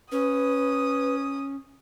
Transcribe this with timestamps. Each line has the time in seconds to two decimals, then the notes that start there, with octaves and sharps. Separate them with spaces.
0.12 C#4 B4 D#6